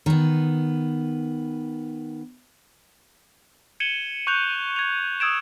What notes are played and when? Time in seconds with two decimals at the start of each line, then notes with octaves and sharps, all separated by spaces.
0.06 D#3 B3
3.80 G#6 C#7 D#7 E7 F#7 G7
4.27 C#6 F#6 G6 F7
4.76 G#6 F7
5.20 D#6 E6 G#6 D7 E7